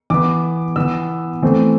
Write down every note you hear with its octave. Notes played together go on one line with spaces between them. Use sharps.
E3 B3 D6
E3 B3 E6
E3 A3 C4